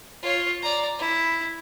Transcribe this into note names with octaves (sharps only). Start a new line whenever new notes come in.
F4 C#5
D5 A#5
E4